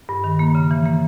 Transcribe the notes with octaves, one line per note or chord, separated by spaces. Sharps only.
G2
D#3
A#3
C#3
E3
A#3